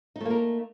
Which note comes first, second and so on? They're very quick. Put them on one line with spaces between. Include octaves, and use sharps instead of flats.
D#4 A3 A#3 A#4